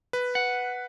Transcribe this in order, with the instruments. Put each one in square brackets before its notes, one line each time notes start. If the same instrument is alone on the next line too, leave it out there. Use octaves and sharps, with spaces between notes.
[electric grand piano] B4
[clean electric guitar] F#5